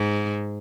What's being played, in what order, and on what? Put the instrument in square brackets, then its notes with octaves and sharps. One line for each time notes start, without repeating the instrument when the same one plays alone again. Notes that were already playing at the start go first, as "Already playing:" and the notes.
Already playing: [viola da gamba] G#2